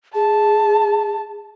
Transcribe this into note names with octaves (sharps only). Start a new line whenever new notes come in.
G#4 A5